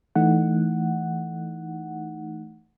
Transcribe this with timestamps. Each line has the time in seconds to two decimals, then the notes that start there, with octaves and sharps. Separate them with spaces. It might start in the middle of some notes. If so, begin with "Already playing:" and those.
0.15 E3 A3 D#4 F#5